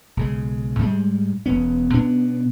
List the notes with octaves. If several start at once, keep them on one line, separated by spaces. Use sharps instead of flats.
B1 C#3 G#3
G#2 G3 G#3
E1 B3 C#4
B2 B3 C#4 D4